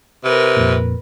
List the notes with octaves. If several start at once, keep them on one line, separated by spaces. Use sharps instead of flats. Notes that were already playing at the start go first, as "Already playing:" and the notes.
C3 A#4 B4
F2 A#2